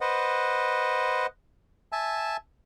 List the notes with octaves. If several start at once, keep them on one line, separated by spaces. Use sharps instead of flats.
B4 C5 D#5 F#5
E5 G#5 A5